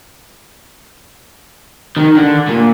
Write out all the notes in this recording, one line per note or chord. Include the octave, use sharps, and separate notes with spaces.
D#3
D3
A#2